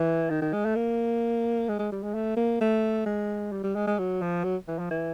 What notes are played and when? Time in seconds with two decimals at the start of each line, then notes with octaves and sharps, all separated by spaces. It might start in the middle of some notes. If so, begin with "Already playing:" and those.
Already playing: E3
0.30 D#3
0.41 D#3
0.53 G#3
0.65 A3
0.76 A#3
1.69 G#3
1.79 G#3
1.92 G3
2.03 G#3
2.14 A3
2.37 A#3
2.61 A3
3.06 G#3
3.52 G3
3.63 G3
3.75 G#3
3.87 G#3
3.99 F#3
4.21 F3
4.44 F#3
4.68 E3
4.79 F3
4.91 E3